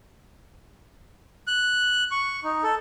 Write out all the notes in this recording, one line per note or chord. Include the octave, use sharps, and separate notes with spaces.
F#6
C#6
D#4
A4